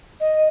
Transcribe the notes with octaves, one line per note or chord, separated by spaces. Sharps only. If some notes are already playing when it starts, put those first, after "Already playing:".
D#5